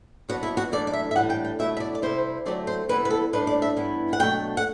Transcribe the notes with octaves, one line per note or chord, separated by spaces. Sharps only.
B2 F#3 B3 D4 F#4
E4
F#4
F#2 E3 A3 D4 D5
D5
E5
E5
A2 E3 G3 D4 F#5
G5
G5
B2 F#3 A3 E4 E5
E5
D5
D5
C3 G3 C4 E4 C5
D3 F#3 A3 C4 D5
C5
C3 E3 G3 B3 E4 B4
B4
A4
A2 G3 D4 B4
D5
E5
G2 E3 B3 E4
F#5
B2 F#3 A3 D4 G5
F#5